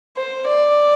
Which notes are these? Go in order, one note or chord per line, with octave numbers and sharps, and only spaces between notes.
C5
D5